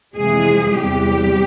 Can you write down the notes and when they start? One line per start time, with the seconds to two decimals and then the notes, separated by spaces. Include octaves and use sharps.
0.16 F2 C3 E3 G#3 G#4
0.78 E2 C3 E3 G3 G4